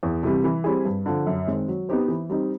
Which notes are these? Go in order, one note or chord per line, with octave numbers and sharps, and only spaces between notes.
E2
C3 E3 G3
E3
G3 C4 E4 G#4
G2
D3 F3
F#2
D#3 G#3 C4
F#3
B3 D#4 G4 C5
E3
G3 C4 D#4